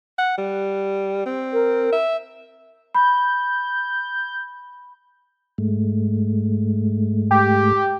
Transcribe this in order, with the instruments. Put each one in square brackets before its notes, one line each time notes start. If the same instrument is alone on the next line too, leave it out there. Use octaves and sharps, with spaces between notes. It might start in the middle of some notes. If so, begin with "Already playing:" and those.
[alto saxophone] F#5
G3
C4
[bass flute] A#4
[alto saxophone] E5
[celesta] B5 [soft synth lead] G6
[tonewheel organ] G#2 G#3 A3
[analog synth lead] G4